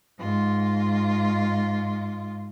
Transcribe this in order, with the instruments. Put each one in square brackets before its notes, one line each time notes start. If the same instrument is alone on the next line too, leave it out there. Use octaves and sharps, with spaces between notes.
[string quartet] G#2 F4